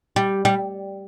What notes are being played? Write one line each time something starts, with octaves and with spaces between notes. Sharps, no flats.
G3
G3